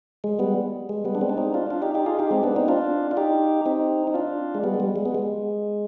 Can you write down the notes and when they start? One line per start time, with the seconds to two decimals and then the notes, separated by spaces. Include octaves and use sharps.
0.24 G#3
0.39 G3 B3
0.89 G#3
1.05 G3 B3
1.15 D4
1.21 G#3 C4
1.29 D4
1.37 C4 D#4
1.54 D4 F4
1.70 D4 F4
1.82 D#4 G4
1.94 D#4 G4
2.06 F4 G#4
2.19 D#4 G4
2.31 G#3 C4
2.43 B3 D4
2.56 C4 D#4
2.68 D4 F4
3.11 F4
3.17 D#4 G4
3.66 C4 D#4
4.07 D#4
4.14 D4 F4
4.55 G#3
4.64 G3 B3
4.74 G#3
4.80 G3
4.96 G#3
5.05 B3
5.15 G#3